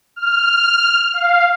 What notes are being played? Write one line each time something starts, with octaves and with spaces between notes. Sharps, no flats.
F6
F5